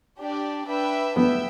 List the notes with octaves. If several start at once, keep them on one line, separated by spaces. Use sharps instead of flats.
D4 G4 D5
D4 B4 E5 G5
B3 E5 G5